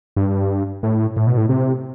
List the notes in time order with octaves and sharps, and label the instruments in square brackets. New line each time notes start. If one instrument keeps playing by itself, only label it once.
[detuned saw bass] G2
A2
A2
B2
A2
C3